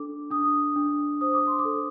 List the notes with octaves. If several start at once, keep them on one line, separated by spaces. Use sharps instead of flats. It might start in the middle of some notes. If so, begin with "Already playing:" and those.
Already playing: D4 A4 D6
D4 D#6
D4
C5 D#6
D6
C6
D6
A4